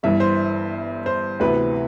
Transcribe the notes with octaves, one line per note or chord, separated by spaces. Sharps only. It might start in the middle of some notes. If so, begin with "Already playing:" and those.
G1 G2 E3 E5
C5
C5
D2 C3 E3 B3 B4